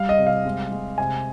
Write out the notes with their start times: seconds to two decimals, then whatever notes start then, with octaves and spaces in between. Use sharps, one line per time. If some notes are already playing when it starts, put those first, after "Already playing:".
Already playing: G3 F5
0.09 D#5
0.18 C3
0.27 F5
0.45 G#3
0.72 G#3
0.98 C3 G#5